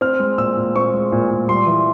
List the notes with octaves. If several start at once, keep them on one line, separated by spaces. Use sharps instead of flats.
C4 F6
G#3
A#2 E6
A#2
C4 C#6
G#3
A#2
A#2
G3 C6
E3